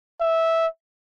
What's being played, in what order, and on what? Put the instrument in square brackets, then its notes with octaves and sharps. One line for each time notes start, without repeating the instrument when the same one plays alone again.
[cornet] E5